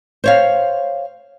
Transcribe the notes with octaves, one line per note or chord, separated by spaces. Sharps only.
C5 C#5 F5